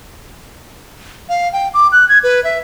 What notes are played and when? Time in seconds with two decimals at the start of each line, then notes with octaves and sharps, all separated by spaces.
1.29 F5
1.53 G5
1.74 D6
1.92 F#6
2.09 G#6
2.24 B4
2.44 E5